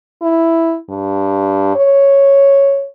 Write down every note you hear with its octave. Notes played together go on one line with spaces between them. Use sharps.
E4
G2
C#5